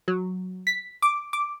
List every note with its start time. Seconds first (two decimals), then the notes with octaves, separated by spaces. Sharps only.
0.08 F#3
0.67 B6
1.02 D6
1.33 D6